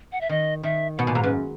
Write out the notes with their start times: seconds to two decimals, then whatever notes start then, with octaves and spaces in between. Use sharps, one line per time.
0.12 F#5
0.21 E5
0.29 D#3 D#5
0.63 D#3 E5
0.98 B2 F#5
1.06 A#2 G#5
1.15 G#2 A#5
1.23 F#2 B4